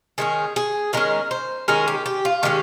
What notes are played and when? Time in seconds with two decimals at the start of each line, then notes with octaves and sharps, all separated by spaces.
0.18 D#3 G#3 C#4 G#4
0.56 G#4
0.93 D#3 G#3 C#4 A#4
1.31 C5
1.68 D#3 G#3 C#4 A#4
1.88 G4
2.06 G4
2.25 F4
2.43 D#3 G#3 C#4 G4